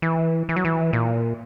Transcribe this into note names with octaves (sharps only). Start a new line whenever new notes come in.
E3
E3
F#3
E3
A#2